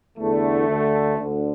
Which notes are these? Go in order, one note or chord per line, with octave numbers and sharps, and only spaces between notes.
E2 D3 A3
D2 D3
D2 D3